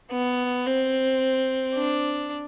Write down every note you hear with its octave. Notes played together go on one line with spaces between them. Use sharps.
B3
C4
D4